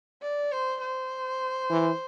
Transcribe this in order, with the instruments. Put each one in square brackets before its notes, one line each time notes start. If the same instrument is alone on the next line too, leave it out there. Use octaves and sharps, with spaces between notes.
[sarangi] D5
C5
C5
[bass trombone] E3